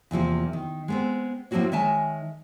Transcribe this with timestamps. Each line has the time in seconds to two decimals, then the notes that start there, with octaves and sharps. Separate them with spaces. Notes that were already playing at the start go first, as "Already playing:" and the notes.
0.11 E2 C3 F3 A#3
0.53 D#3
0.88 G#3 B3 C4
1.51 A2 F3 A#3 C4 F#4 C#5
1.72 D#3 G#3 C#5 E5 G#5 A5